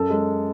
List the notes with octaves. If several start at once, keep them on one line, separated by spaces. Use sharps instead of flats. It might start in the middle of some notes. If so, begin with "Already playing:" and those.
Already playing: F#2 A4
G#3